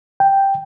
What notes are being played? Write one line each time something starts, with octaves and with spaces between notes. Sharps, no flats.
G5